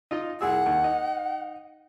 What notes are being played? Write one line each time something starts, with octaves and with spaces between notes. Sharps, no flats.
D#4 F4 D#5
C2 G#4 F#5 E6
D#2
D#4